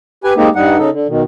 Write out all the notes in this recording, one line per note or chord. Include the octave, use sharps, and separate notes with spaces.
G4 B4 G#5
G#3 A#3 C4 D#4 G4
G2 G3 D#4 F#5
C#3 D#4 A4
D3
B2 D#3